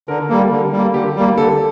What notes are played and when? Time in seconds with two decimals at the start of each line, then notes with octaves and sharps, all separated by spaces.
0.08 D3 A#4
0.29 G3 A#3 A4
0.51 D3
0.72 G3 A#3
0.93 D3 G4
1.16 G3 A#3
1.38 D3 A4